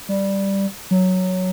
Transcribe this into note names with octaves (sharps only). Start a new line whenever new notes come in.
G3
F#3